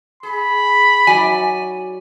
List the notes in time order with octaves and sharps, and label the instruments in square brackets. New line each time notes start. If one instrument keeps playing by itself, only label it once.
[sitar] G#4 [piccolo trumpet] B5
[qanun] F#3 [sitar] D#4 D5 [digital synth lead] G#5